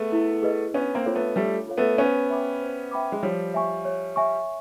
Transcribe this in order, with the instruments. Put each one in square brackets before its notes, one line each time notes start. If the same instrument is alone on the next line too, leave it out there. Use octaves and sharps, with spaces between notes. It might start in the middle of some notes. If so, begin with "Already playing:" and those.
Already playing: [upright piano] A3 B3 [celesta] G#4 B4
[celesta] E4
G#4 B4 D#5
[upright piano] B3 C#4 [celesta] D4
[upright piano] A#3 C4
[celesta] F4 A4 C#5 F5
[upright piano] A3 B3
[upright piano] G3 A3 [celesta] D4
[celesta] F4 A4 C#5 F5
[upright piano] A3 B3
[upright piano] B3 C#4 [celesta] C5
[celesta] E5 G5 B5 D6
C5
E5 G5 B5 D6
[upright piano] G#3
[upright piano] F3 G3 [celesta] C#5
[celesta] E5 G#5 C#6
C#5
E5 G#5 C#6